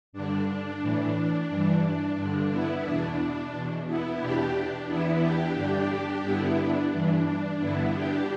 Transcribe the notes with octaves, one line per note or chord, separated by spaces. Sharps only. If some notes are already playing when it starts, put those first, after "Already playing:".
G2 D3 D4
D4
A2 E3
G2 E3
D4
G2 D3
B3 E4
E2 B2 D4
E2 B2
B3 E4
E2 B2 D4 G4
D4
E2 E3 B3 E4
D4 G4
G2 D3 D4 G4
G2 D3 B3 E4
D4
G2 E3 D4
D4
G2 D3 B3 E4
D4 G4